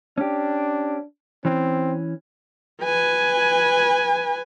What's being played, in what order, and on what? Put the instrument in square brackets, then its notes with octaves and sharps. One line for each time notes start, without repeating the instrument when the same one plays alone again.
[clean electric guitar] C#4 G4 [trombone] D4
[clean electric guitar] E3 C#4 [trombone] C4
[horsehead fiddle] B4 G#5